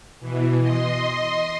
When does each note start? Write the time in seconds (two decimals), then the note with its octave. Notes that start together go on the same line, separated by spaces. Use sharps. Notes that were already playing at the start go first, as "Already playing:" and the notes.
0.20 B2 E3
0.60 D#5 C6